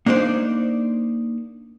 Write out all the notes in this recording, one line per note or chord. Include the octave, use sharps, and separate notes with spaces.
A#3 D4 D#4 C5 D5